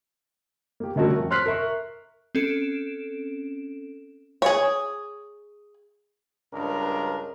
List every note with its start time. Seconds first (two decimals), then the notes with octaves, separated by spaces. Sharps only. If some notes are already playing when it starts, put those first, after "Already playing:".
0.80 A#3 G4
0.96 D3 G3 A3 C#4 F#4 A#4
1.16 F2
1.30 C5 C6 F6 F#6 B6 C7
1.46 A#4 E5 C#6
2.35 C4 C#4 A4 D7 E7
4.42 G#4 C#5
6.53 C#2 G2 D4 A#4